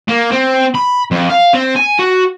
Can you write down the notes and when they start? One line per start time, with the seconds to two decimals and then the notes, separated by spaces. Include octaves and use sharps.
0.08 A#3
0.31 C4
0.75 B5
1.11 F2
1.30 F5
1.54 C4
1.76 G#5
1.99 F#4